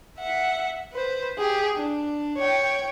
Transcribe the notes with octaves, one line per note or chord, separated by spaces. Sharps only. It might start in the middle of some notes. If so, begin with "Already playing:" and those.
E5 F#5
B4 C5
G4 G#4
D4
C#5 G5